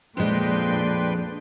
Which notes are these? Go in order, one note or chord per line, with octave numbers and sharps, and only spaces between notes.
F2 A#2 G#3 D4 B4 G5 C6